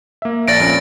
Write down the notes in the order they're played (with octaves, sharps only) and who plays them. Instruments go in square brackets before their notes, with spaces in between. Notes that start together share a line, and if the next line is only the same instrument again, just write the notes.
[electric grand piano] A#3 E5
[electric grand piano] A#1 D5 [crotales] A6 A#6 D7
[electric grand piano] F2 A#2 C#4 [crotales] D7